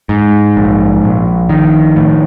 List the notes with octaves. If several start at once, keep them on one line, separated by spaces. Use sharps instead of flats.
G#2
A#1
A#1
D#3
A2